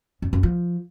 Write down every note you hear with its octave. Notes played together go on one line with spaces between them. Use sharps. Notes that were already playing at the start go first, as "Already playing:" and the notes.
F#2
F#2
F3